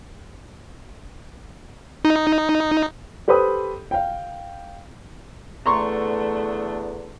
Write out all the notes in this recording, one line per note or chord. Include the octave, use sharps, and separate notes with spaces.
D#4
G4 A4 B4 C5 B5 D#6
F5 G5
E2 D3 A3 D4 A#5 C6 C#6